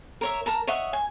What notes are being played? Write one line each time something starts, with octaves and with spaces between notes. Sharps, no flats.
A#4 C#5 E5
A#4 A5 A#5
C#5 D#5 E5 F#5
G#5